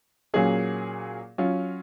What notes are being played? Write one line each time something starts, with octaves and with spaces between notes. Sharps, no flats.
A#2 F#3 A#3 C#4 G#4
F#3 C#4 F4